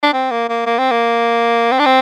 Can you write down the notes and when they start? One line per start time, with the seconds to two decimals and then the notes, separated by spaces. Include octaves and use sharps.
0.03 D4
0.13 C4
0.31 A#3
0.49 A#3
0.66 A#3
0.79 C4
0.91 A#3
1.72 C4
1.79 D4
1.86 C4